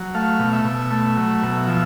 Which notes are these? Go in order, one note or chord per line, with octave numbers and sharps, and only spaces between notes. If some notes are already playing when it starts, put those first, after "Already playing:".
Already playing: F#3
A3 F5
B2
E5
B2
A3
F#3
B2
F3 E5